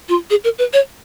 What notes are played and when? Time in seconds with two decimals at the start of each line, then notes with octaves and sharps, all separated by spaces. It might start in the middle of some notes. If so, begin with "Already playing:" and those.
0.09 F4
0.30 G#4
0.44 A#4
0.59 B4
0.73 C#5